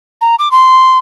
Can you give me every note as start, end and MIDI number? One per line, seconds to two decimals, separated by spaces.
0.21 0.35 82
0.39 0.51 86
0.51 0.98 84